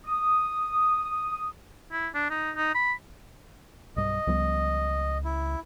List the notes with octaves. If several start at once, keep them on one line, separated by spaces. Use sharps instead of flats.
D#6
E4
D4
D#4
D#4
B5
B1 G2 D#5
C#2 F3 G3 B3
E4